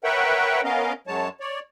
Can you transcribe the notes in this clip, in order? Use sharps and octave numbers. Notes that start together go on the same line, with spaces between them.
A#4 B4 C#5 E5 F#5 G5
B3 C#4 A#4 D#5 F5
F#2 F#3 G#3 C#5 A5
C#5 D5